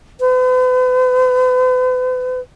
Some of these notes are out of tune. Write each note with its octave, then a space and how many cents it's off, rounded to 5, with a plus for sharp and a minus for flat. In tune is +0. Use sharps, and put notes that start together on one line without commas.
B4 +45